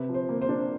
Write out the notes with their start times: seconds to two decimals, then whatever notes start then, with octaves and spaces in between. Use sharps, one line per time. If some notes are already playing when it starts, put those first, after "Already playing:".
Already playing: C3 B4
0.09 F3
0.14 C5
0.29 A#3
0.42 C5
0.49 D4